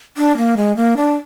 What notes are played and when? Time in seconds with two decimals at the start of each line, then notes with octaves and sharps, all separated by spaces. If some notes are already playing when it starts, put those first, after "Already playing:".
0.17 D4
0.37 A#3
0.57 G#3
0.77 A#3
0.97 D4